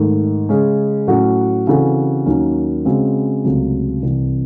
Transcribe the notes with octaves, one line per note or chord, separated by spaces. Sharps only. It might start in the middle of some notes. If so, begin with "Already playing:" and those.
Already playing: G#2 D#3 A3
C#3 G#3 C#4 G#4
A2 F#3 C#4 F#4
C#3 E3 C4 F#4 A4
D#2 D#3 F#3 C#4
C#3 G#3 C4 F#4
C#2 C3 F#3 A3
C2 C3 E3 C4